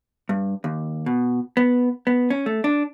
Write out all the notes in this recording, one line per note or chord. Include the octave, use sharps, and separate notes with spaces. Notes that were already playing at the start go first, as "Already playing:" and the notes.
G2
D#2
B2
B3
B3
C#4
A3
D4